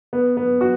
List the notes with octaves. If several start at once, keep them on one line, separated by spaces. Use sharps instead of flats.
B3
B3
F#4